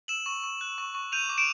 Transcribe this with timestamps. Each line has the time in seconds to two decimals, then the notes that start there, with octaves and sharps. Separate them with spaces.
0.08 E6 E7 F#7
0.26 C#6
0.44 C#6
0.61 F#6
0.78 C#6
0.95 C#6
1.12 G6 D#7 F7
1.29 D6
1.37 D7 E7